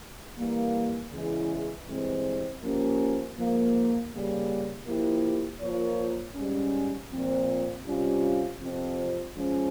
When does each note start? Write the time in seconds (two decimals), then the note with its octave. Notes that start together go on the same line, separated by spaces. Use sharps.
0.37 E3 G3 A#3
1.12 E2 C#3 E3 G#3 E4
1.86 G2 E3 G#3 C4
2.61 F3 A#3 C#4 G4
3.37 G#2 F3 A#3
4.11 C#3 G3 A#3
4.86 F3 A#3 E4 G4
5.61 F3 A#3 F4 A#4 C#5
6.36 G#2 G3 C#4
7.11 A#2 F3 C4
7.85 C3 G3 C#4 F4
8.61 F2 C3 F3 C4
9.35 F3 G#3 C#4